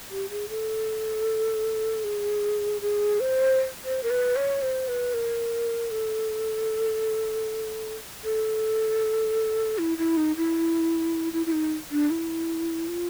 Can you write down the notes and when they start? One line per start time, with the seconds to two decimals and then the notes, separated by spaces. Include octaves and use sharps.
0.11 G4
0.30 G#4
0.49 A4
2.04 G#4
2.81 G#4
3.20 C5
3.85 C5
4.03 A#4
4.10 B4
4.36 C#5
4.62 C5
4.88 B4
5.14 A#4
5.91 A4
8.24 A4
9.78 E4
9.98 E4
10.17 D#4
10.36 E4
11.33 E4
11.46 E4
11.52 D#4
11.91 D4
12.10 E4
12.88 F4